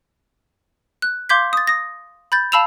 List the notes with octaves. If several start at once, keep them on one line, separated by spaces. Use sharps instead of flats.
F#6
F5 C6 D6 G6 G#6 B6
D#6 A6
D#6 A#6
B5 G6 A6
F5 A5 B5 E6 E7 F7